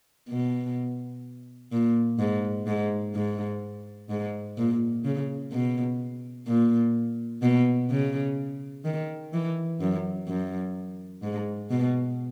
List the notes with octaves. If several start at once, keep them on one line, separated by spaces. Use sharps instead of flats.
B2
A#2
G#2
G#2
G#2
G#2
A#2
C#3
B2
A#2
B2
C#3
D#3
E3
F#2
F#2
G#2
B2